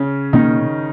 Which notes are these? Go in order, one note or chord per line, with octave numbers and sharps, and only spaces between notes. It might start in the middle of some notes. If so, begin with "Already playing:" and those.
Already playing: C#3 C#4
B2 D#3 A#3 C#4 D#4